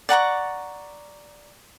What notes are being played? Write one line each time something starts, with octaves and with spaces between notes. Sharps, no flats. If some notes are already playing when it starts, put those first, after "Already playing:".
D5 F#5 A#5 C#6